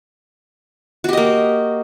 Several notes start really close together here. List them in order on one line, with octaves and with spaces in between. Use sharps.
F#4 G4 D#5 A#3